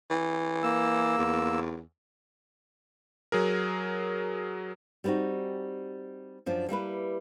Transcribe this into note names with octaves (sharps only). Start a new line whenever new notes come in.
E3
A#3 E6
E2
F#3 G#4 A#4
G3 B3 C4 D#4 F#4
F#2 F3 D4
G3 A#3 E4 B4